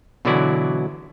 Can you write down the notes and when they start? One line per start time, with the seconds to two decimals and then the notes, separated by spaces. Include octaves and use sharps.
0.25 B2 D3 E3 F#3 E4 D5